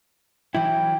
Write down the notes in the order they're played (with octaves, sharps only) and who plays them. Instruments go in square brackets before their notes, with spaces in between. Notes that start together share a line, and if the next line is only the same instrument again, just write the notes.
[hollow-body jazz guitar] E3 F#3 E4 [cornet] G5